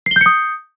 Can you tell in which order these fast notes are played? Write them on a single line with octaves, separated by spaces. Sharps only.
C7 G7 G6 C#7 D#6